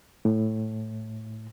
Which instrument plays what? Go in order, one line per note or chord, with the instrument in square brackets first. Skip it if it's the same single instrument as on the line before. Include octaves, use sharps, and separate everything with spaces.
[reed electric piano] A2